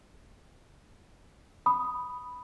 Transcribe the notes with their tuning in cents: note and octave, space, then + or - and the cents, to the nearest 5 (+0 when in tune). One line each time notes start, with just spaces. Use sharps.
B5 +0 D#6 +0